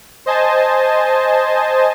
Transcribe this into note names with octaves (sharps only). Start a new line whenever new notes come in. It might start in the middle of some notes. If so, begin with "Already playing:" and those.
C5 D#5 G#5 A5